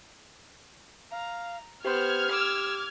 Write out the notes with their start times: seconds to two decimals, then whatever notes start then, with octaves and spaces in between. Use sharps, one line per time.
1.12 F5 A#5
1.85 B3 G4 C5 C6 F6 G#6
2.31 D6 E6